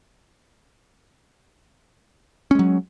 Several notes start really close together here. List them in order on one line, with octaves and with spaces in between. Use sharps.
C#4 G#3 F#3